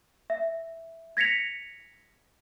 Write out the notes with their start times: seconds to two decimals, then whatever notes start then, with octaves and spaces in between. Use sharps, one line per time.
0.30 E5
1.17 G#6 A#6 B6 C#7 F7